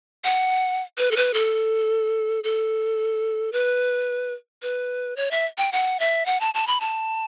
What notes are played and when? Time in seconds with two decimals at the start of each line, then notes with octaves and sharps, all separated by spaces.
0.24 F#5
0.98 B4
1.11 A4
1.16 B4
1.34 A4
2.44 A4
3.52 B4
4.62 B4
5.16 C#5
5.31 E5
5.58 G5
5.72 F#5
6.00 E5
6.26 F#5
6.41 A5
6.54 A5
6.67 B5
6.80 A5